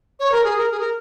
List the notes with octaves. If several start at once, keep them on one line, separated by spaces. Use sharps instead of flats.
C#5
A#4
G#4
A#4
G#4
A#4